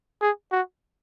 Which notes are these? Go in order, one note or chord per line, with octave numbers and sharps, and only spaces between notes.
G#4
F#4